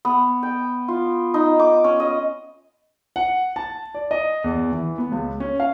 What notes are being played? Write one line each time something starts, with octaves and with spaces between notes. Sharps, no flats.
B3
G5
F4
D#4
D6
C#4
D#5
F#5
A5
D5
D#5
E2
E3
B3
C#2
C#4
F5